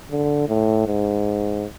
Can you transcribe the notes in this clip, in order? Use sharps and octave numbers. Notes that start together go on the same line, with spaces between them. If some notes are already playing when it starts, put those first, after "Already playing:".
D3
A2
G#2